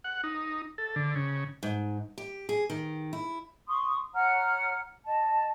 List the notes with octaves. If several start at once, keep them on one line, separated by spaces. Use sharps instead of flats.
F#5
D#4
A4
D3
C#3
G#2
G4
G#4
D#3
E4
C6 C#6 D#6
C#5 F#5 A#5 F6
D#5 A5